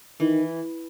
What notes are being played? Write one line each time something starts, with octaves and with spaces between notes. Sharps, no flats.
D#3 E3